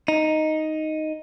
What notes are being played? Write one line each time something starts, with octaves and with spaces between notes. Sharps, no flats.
D#4